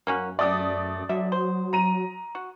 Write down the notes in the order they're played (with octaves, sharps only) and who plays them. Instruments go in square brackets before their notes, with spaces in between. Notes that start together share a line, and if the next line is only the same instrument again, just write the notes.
[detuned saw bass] F#2 [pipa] A#3 C#4 F#4
[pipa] A3 G4 [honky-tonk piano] D5 D#6
[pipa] D3 E5 [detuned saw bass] F#3
[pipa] C5
[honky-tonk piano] A#5 D#7
[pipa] F#4